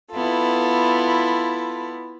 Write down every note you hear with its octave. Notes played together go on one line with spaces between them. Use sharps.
B3 E4 F4 A4